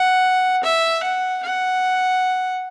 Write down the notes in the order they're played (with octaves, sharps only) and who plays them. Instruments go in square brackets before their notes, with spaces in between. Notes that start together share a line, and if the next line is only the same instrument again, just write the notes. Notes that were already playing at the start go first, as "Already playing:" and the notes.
Already playing: [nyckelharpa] F#5
E5
F#5
F#5